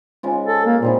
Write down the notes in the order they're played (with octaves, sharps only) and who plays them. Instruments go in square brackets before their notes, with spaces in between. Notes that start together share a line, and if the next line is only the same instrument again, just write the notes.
[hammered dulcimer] C#3 G#3 F4
[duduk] A4
A#3
[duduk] A#2 [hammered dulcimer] C4 D#4 E4